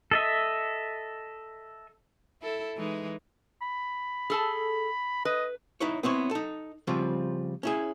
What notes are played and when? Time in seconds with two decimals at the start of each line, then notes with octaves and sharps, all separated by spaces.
0.11 A4 D#5 E5
2.42 E4 A4
2.77 E3 G#3 D#4
3.62 B5
4.30 G#4 A4 A5
5.25 B4 D#5
5.80 D#4 E4 B4 C#5
6.03 B3 C4 E4 C#5
6.31 D#4 A4
6.87 C#3 F3 G3 C4 F4
7.63 C#4 E4 G#4